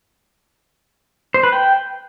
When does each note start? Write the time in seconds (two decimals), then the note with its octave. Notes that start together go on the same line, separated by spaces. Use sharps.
1.34 C5
1.43 B4
1.52 G5